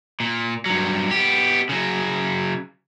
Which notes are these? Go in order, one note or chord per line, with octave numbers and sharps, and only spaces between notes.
A#2
G2 F#3
B3 G4
C#3 F#3